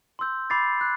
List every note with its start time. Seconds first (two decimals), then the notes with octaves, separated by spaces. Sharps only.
0.19 C6 E6 G6
0.50 B5 D6 A6 C7
0.81 F#6